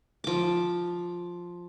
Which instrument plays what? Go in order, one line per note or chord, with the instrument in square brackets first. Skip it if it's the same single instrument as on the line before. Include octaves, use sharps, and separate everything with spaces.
[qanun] F3 D6